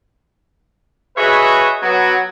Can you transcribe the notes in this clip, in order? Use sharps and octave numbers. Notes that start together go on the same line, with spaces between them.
F#4 G#4 B4 C#5 D#5 E5
F#3 B3 F#4